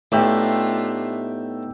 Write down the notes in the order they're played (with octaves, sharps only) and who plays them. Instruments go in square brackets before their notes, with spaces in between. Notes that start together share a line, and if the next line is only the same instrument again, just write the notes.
[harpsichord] A2 [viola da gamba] A3 D4 F4 [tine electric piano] B3 D#4 [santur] G4 E5